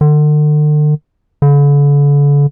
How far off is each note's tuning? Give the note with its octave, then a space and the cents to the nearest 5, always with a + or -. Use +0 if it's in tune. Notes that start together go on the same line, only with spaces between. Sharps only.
D3 +40
D3 -40